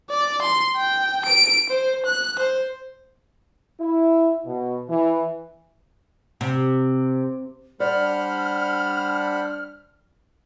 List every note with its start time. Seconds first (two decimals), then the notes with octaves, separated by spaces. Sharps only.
0.10 D5
0.42 C6
0.77 G5
1.25 D7
1.70 C5
2.06 F#6
2.39 C5
3.80 E4
4.45 B2
4.88 E3
6.41 C3
7.80 G3 D4 C5 D5 F#5 B5 F6